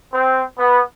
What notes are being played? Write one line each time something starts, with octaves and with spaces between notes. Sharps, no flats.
C4
B3